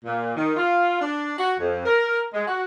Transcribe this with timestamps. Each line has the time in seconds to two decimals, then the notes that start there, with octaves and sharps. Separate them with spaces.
0.05 A#2
0.37 D#3
0.57 F4
1.01 D4
1.38 F#4
1.60 F2
1.85 A#4
2.34 G#3
2.47 F#4